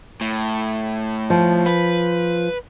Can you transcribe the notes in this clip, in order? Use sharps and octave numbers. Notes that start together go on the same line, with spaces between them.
A2
F3
B4